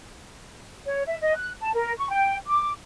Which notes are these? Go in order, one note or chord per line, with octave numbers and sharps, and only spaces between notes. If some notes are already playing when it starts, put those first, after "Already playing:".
C#5
E5
D#5
F#6
A5
A#4
C#6
G5
D6